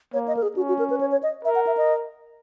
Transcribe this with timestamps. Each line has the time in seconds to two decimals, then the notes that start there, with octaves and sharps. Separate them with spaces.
0.13 A#3 C#5
0.28 D#5
0.37 A#4
0.42 G#4
0.56 C#4 F#4
0.68 F#4
0.79 A#4
0.90 B4
1.01 C#5
1.12 C#5
1.23 D#5
1.45 A#4 E5
1.55 F#5
1.67 E5
1.77 D#5